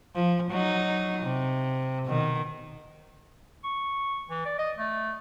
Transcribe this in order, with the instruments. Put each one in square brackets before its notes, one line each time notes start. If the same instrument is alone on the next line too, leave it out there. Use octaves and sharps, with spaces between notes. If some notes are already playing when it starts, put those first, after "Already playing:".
[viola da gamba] F3
F#3 D#4
C3
B2 D#3
[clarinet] C#6
E3
D5
D#5
A3